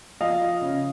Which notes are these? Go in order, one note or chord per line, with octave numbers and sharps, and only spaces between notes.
F3 D#5 F5
F3
C#3